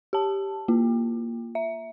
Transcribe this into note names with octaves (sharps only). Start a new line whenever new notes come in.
G4 A5
A#3 F4
E5